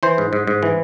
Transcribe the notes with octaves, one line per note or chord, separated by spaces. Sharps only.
E3 C5
G#2
G#2
G#2
E3